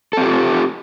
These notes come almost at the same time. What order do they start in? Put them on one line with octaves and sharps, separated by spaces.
A4 C4 G4 F4